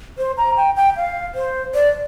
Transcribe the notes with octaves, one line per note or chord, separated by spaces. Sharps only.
C5
A#5
G5
G5
F5
C5
D5